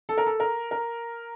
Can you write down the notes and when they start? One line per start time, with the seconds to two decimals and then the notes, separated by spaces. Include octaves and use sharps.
0.09 A4
0.18 A#4
0.26 A4
0.40 A#4
0.71 A#4